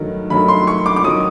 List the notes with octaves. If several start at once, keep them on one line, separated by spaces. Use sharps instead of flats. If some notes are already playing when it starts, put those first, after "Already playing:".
Already playing: G2 D#3 F#3 A3
G2 D#3 F#3 A3 B5
C6
C#6
D6
D6
D#3 F#3 D#6